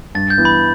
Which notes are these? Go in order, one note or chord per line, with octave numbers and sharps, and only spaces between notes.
G2 A6
G6
E3 B3
B5